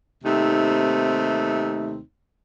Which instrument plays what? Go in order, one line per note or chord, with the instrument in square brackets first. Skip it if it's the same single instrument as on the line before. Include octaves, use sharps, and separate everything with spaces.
[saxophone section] D#2 C3 A3 C4 D#4